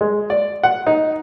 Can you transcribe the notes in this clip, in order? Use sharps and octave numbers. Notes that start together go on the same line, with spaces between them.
G#3
D5
F#5
D#4